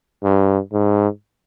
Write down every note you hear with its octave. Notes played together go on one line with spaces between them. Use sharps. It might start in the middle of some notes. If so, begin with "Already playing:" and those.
G2
G#2